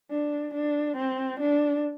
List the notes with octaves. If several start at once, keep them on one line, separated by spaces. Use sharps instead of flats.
D4
D4
C4
D4